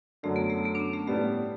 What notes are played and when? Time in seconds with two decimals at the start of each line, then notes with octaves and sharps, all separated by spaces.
0.23 F#2 D3 F#3 A3
0.36 B3
0.50 A3
0.65 B3
0.75 D4
0.80 C#4
0.93 A3
1.07 A2 G3 A3 B3